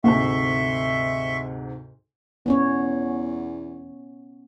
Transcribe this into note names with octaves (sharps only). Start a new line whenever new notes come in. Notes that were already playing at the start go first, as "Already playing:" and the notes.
D2 G#2 C3 A#3 D4 E5 C6 C#6
E2 B3 C#4 C#5